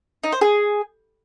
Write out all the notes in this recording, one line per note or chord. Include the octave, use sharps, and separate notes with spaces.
D#4
C5
G#4